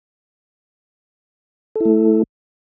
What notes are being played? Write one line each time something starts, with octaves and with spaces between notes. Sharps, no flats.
A3 E4 A4